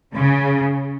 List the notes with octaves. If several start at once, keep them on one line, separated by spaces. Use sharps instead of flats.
C#3